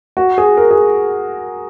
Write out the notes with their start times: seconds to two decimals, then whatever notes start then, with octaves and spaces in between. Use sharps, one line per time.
0.17 F#4
0.38 G#4
0.57 A#4
0.71 G#4